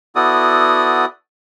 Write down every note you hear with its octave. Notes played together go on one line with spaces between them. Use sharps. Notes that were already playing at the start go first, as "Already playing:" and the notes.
B3 E4 F#4 A4 D5 D#6